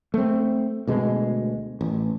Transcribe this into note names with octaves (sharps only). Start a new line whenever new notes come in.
A3 C4
D2 B2 G#3
A1